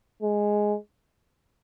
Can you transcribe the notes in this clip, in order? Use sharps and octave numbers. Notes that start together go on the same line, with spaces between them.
G#3